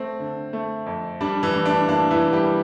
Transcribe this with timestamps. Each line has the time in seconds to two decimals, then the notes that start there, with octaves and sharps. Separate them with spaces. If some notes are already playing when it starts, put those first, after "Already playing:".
Already playing: A3 C4
0.20 D3
0.53 A3
0.86 F2
1.21 G3 D4
1.43 E3 E4
1.54 A2
1.65 D4
1.88 A#3 D4
2.11 E3 E4
2.22 G3
2.33 G3 G4